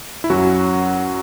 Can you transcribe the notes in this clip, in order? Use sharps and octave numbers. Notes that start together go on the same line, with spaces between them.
E4
F#2 F#3 C#4 F#4